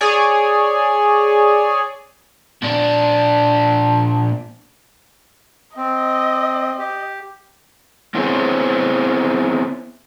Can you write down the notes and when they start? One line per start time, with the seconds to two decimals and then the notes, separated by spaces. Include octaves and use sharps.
0.01 G#4 C#5 D5 G#5
2.62 A#2 D4
5.77 C4 D#5
6.79 G4
8.14 B3 C4 E4 G#4 C5 C#5